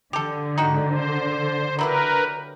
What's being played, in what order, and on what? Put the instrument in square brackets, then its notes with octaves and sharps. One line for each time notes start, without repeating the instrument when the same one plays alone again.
[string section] D3 [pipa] G4 A4
[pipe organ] G#2 [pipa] D#4 F#4 G5
[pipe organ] C5
[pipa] F#3 E4 G4 [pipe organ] A#4 B4